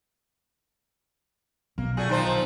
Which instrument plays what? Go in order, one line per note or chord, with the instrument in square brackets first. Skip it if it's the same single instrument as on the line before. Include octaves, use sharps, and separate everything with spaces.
[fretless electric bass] B1 B2 B3 [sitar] A#3
[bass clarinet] A#2 [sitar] A3 F#4 G#4
[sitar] D#3 F3 C5 [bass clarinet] D#4